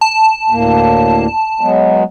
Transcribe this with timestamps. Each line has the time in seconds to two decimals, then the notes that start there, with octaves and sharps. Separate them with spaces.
0.01 A5
0.50 D2 A2 A#3
1.61 F#3 G#3 B3